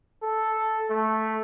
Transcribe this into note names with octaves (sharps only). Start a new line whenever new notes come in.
A4
A3